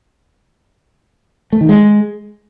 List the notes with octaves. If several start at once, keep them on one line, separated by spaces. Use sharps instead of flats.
A3
D#3
G#3